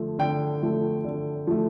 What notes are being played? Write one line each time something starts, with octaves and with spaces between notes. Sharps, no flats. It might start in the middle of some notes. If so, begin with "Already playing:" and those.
Already playing: D3 F3 A3
D3 G5
F3 A3
D3
F3 A3